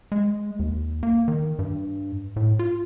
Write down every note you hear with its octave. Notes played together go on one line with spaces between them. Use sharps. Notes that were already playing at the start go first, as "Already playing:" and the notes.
G#3
D#2
A#3
D#3
G2
A2
F4